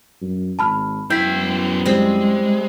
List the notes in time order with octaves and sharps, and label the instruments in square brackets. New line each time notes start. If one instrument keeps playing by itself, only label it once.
[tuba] F#2
[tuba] G#1 [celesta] A5 B5 F6
[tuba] F#2 [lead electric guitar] B3 G5 [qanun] E4 [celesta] G6 B6
[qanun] G3 C4 [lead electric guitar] G#3